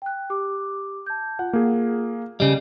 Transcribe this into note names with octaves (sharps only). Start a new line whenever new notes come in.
G5 F#6
G4 D6
A5 G6
F4 F#5
A#3 G#4
C#3 G3 D#5